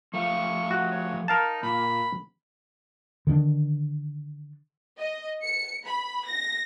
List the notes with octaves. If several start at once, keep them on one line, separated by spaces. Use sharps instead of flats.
F3 A3 F5 C#6
F#4
C#5
D#4 A#4 F5 A5
A#2 B5
D3 D#3 C4 D4
D#5
C#7
B5
A#6